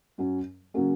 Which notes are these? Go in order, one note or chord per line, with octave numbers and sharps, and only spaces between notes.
F#2 F#3 C#4
C#3 F#3 A#3 C#4